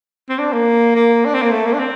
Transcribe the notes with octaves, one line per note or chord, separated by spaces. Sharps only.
C4
D4
A#3
A#3
D4
C4
A#3
A3
A#3
D4
C4